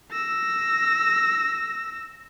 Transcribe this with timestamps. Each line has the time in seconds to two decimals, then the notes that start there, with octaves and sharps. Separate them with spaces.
0.12 E6 A#6